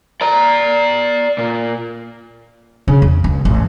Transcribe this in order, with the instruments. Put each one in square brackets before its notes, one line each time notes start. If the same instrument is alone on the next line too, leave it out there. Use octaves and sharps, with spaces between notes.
[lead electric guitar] D5 A#5
A#2
[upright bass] C#3
E2
C#2
A1